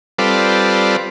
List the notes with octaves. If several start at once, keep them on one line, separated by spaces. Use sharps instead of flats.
G3 C4 F4 A4 B4 D5